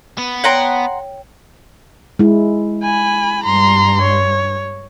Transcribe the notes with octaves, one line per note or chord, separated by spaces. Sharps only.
B3
C#5 F#5 G5 A#5 C6
G#3 E4
G#5 B5
G2 A#5 C6
C#5